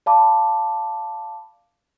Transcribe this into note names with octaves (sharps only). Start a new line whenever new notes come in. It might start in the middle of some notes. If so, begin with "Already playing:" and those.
D5 F5 A5 B5 D6